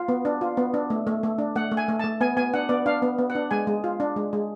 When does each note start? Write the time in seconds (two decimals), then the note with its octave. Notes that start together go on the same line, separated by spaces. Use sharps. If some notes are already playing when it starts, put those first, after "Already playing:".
Already playing: F4
0.08 B3
0.25 D4
0.41 F4
0.57 B3
0.74 D4
0.90 A3
1.07 A3
1.23 A3
1.38 D4
1.56 A3 F#5
1.71 A3
1.77 G#5
1.89 A3
1.99 A3 A5
2.21 B3 G#5
2.37 B3 G#5
2.54 D4 F#5
2.69 B3 D5
2.86 D4 F5
3.02 B3
3.18 B3
3.30 F#5
3.35 D4
3.51 G#3 G#5
3.67 G#3
3.84 F4
4.00 D4
4.16 G#3
4.33 G#3